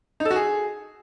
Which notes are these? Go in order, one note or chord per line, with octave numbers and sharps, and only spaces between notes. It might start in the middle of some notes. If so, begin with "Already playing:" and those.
D#4
A4
F#4
G#4